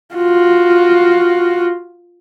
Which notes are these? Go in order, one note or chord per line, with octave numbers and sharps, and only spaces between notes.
F4 F#4